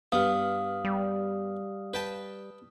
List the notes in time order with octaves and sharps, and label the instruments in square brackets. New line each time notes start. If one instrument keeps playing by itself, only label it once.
[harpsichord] G2 B3 [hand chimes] F5 [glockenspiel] D#6 F6
[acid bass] G3
[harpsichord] B4 G5 A5